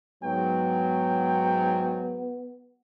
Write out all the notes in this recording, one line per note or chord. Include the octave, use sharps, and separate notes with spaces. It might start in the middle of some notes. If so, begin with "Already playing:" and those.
G#2 F#3 B3 G5